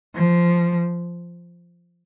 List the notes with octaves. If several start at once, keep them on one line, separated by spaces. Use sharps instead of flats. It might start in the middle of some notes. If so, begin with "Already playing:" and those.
F3